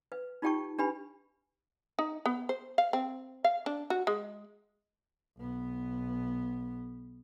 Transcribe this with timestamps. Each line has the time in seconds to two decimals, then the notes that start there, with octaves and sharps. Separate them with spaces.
0.12 B4
0.42 D#4 F4 G4 G5 A5 C#6
0.79 D4 G4 B4 G#5 B5
1.99 D#4
2.26 B3
2.49 C5
2.78 F5
2.93 C4
3.44 F5
3.66 D4
3.90 F#4
4.07 G#3
5.37 B1 B3